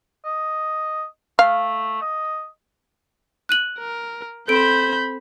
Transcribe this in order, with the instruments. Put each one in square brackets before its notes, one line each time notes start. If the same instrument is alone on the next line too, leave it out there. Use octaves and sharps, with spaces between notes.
[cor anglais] D#5
[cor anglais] A3 [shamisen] F5
[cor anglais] D#5
[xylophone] F#6 D#7 F#7
[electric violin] A#4
[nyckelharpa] C4 C5 [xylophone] A4 D7 [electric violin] B5 G6